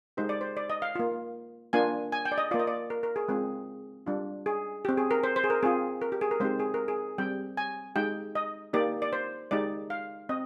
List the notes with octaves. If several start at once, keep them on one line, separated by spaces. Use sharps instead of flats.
G#3 D#4 G4 C5
D5
C5
D5
D#5
F5
A#3 F4
A#3 D4 F4 G#5
G#5
G5
D5
D#5
A#3 F4 D5
D#5
D5
A#4
A#4
G#4
G#3 C4 F4 G#4
G3 D4 F4
G#4
C4 G4
G#4
A#4
C5
C5
G#4
A#4
C4 F4 G#4
A#4
G4
G#4
A#4
G#3 C4 D#4 G4 C5
G#4
A#4
G#4
G3 C4 G4 G5
G#5
G#3 D#4 G4 G5
D#5
A#3 D#4 G4 D5
D5
C5
G#3 D#4 G4 D5
F5
C4 D#5